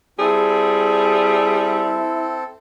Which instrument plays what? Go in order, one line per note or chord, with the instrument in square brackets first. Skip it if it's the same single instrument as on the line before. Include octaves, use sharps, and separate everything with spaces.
[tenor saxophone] G3 [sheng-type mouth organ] C4 A4 [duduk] E4 [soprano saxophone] G#4